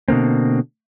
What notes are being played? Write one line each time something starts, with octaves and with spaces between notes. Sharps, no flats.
B2 D3 A#3 C4